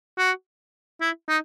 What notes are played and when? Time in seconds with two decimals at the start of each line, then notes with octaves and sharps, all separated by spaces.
0.18 F#4
1.01 E4
1.29 D#4